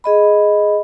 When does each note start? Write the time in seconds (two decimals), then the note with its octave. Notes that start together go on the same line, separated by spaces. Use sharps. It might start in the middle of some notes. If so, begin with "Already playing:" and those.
0.04 G#4 D#5 B5